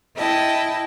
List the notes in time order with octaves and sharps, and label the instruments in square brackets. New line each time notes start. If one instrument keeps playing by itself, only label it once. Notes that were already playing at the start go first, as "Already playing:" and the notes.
[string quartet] E4 D#5 G5 A5